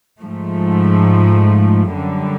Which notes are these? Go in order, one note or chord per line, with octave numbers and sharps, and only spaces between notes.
G#2 F3 A3
F#2 D3 G3